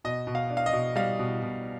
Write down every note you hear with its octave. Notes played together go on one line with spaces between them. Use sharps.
B2 D#5
B2
F5
D4
F5
D#5
B2
G3 F5
B2
B2